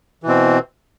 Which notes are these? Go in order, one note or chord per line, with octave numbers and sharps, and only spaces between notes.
B2 E3 C4